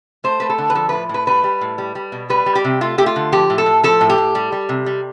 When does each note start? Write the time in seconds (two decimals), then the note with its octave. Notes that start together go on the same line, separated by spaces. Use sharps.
0.24 A3 C5
0.40 A3 B4
0.50 A4
0.58 D3
0.70 B4
0.75 F3 A4
0.89 A2 B4
1.09 A2 B4
1.27 G3 B4
1.44 G3
1.61 A2
1.78 G3
1.95 G3
2.12 B2
2.30 G3 B4
2.46 G3
2.55 G4
2.64 C3
2.81 A3 F4
2.98 A3 G4
3.06 F4
3.16 D3
3.32 F3 G4
3.50 A2
3.58 A4
3.66 A2
3.83 F3 A4
4.01 A2
4.10 G4
4.18 A2
4.35 G3
4.52 G3
4.69 C3
4.86 G3